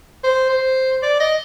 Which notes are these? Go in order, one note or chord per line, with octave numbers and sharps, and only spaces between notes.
C5
C5
D5
D#5